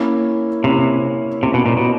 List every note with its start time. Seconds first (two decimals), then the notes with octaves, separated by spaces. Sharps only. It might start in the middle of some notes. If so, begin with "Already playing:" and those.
Already playing: A#3 C#4 E4
0.64 C3 A#3 C#4 E4
1.43 C3 A#3 C#4 E4
1.54 B2
1.66 A#2
1.77 B2